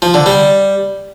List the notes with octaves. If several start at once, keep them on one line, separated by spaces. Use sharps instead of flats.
F3
D3
G3